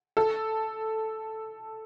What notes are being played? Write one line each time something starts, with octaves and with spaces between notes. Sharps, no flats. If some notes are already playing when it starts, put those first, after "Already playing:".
A4